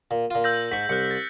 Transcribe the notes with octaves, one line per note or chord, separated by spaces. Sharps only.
A#2
A#2 F4
E6 G6 A#6
G#2 C#6 B6
C2 F#6 C#7
A6